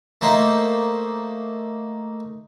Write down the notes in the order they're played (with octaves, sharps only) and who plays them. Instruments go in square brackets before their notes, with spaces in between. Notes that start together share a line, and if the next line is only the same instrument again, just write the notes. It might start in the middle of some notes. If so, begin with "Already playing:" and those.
[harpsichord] A3 A#3 D#4 C5